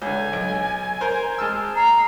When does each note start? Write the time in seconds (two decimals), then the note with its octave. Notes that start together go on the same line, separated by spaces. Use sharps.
0.02 C#2 D3 G#5
0.33 B1
1.01 A#4 C5
1.38 G#3 A5 E6 F6
1.76 A#5 C7